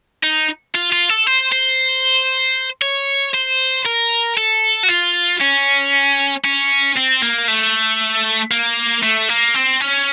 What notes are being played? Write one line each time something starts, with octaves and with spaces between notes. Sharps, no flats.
D#4
F4
F4
A4
C5
C5
C#5
C5
A#4
A4
F#4
F4
C#4
C#4
C4
A#3
A3
A#3
A3
A#3
C4
C#4